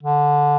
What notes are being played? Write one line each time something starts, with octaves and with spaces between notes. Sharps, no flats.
D3